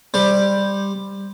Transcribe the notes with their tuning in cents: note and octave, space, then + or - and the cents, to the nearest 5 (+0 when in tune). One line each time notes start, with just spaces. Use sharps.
G3 +10 C5 +0